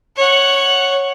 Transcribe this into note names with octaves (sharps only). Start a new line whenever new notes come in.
C#5 F#5